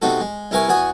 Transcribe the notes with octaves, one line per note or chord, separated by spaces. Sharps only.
C3 B3 D#4 F#4 A4
G#3
C2 E4 A#4 B4 G#5 C#6
E2 F#4 F#5 G#5 D#6